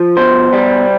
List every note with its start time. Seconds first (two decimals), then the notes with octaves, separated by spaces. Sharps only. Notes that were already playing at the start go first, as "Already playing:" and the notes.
Already playing: F3
0.17 B2 C5
0.53 G3